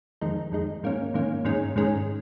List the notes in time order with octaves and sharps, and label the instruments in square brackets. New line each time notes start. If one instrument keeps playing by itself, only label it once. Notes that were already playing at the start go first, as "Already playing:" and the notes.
[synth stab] F2 D#3 G#3 D#4
F2 D#3 G#3 D#4
G#2 D#3 A#3 C#4
G#2 D#3 A#3 C#4
G#2 D#3 G#3 C#4
G#2 D#3 G#3 C#4